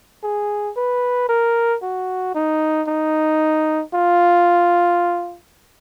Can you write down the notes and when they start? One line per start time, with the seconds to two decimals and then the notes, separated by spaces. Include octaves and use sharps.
0.23 G#4
0.76 B4
1.29 A#4
1.82 F#4
2.35 D#4
2.87 D#4
3.94 F4